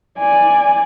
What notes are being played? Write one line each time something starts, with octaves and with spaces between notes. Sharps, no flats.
D5 G#5